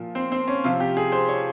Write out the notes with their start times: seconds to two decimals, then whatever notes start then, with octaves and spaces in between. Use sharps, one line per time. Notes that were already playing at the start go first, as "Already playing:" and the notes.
Already playing: A#2 F3
0.15 C4
0.32 C4
0.48 C#4
0.64 C3 F3 F4
0.80 G4
0.97 G#4
1.12 C5
1.29 C#5